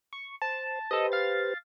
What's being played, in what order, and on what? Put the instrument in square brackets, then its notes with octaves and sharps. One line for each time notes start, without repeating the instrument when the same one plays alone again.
[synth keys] C#6
[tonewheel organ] C5 [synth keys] A5
[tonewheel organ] G4 B4 C5 [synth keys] A4 D#5
[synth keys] F5 A6